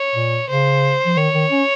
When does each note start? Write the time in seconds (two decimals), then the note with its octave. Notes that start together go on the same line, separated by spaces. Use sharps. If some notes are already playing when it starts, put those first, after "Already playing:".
Already playing: C#5
0.15 A#2
0.49 C#3 C5
1.06 F3
1.17 D#3 C#5
1.34 D#3
1.51 C#4